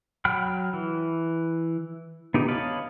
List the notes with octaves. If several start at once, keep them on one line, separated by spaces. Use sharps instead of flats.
F#3 F#5 G5 B5 F6
E3
B3 D#4 G4
C#5 D#5 F5 A5 B5